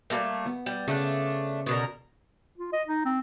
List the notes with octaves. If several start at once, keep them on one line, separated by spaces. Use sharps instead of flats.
G3 A3 A#3
B3
G3
C#3 A3 D4
B2 D3 A#4 F#5
F4
D#5
D#4
C4